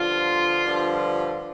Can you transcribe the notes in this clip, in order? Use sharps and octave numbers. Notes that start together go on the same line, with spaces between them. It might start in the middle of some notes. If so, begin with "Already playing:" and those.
Already playing: G2 D3 F3 F4
G2 D3 F3